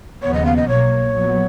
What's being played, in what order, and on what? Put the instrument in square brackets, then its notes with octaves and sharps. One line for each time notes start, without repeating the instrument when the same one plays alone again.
[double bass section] D#2 C#3 F3 B3 [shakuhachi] C#5
[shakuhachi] D#5
F5
D#5
[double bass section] B1 B2 A#3 [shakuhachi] C#5
[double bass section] A#1 A#2 F#3 B3